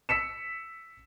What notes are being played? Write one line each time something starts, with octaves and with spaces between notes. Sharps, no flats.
E6 B6 C#7 E7